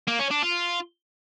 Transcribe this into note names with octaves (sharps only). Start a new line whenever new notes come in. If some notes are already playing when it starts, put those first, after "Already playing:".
A#3
C#4
D4
F4